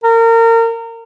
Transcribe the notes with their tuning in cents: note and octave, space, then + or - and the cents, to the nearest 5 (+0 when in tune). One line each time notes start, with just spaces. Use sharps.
A#4 -30